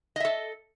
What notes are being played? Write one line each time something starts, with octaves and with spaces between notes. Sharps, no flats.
A4 D#5 E5